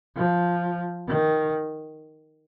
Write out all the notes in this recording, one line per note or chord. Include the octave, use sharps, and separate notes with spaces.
F3
D#3